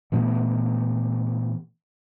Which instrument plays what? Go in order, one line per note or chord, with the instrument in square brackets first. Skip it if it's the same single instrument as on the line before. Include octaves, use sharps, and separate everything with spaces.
[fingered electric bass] A#2 E3 A3 B3